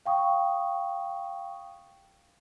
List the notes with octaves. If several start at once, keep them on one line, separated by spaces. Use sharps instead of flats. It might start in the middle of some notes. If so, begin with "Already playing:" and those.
F5 G5 C#6 D#6